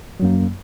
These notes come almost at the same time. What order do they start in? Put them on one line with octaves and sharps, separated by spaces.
F#3 F#2 A#3